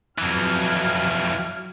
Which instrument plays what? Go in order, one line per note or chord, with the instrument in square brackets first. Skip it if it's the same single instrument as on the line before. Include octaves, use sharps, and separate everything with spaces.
[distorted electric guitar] F2 E3 [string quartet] F#3 F6 G#6